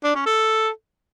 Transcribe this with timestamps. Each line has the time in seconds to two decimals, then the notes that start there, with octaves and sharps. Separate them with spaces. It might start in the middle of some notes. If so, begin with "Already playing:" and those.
0.04 D4
0.15 C#4
0.26 A4